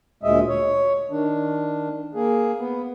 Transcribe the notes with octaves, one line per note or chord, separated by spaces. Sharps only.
D2 A#2 G#3 D#5 E5
C#5
D#3 D4
A#3 G#4
B3